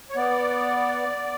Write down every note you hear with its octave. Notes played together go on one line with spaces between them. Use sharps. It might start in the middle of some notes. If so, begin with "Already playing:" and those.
C#5
B3 D5